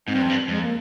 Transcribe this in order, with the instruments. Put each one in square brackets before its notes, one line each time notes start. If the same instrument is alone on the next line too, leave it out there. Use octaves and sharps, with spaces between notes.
[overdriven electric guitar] G#2 [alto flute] C4
[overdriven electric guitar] G2
F2
G2
[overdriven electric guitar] F2 [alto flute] G#3
[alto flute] A#3